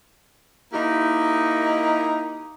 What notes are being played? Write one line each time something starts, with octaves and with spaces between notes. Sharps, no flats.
A#3 D#4 E4 G4